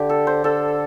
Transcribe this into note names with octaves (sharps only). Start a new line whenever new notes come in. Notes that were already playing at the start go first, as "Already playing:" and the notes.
Already playing: D3 G4
A4
C5
D3 A4